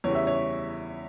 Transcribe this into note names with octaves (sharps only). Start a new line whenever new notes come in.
E2 C#3 E3 G3 C#5
E5
C#5